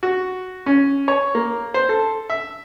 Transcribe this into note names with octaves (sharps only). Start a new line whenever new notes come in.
F#4
C#4
C#5
A#3
C5
A4
E5